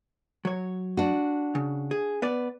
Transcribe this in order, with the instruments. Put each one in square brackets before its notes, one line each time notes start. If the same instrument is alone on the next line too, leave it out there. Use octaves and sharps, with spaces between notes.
[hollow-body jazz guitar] F#3 C#5
[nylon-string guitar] D4 F#4
[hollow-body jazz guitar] C#3
G#4
B3 B4 D5